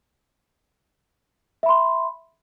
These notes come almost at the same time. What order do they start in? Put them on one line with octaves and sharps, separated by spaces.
E5 B5 C6